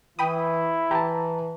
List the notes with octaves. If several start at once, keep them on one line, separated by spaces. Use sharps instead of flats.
E3 E4 G5 B5 D#6
E3 G4 A5 A#5